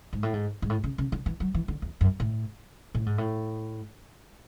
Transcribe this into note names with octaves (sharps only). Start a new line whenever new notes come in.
G#2
A2
G#2
G#2
A2
C#3
C#3
D3
E3
F#3
E3
D3
E2
F#2
A2
A2
G#2
A2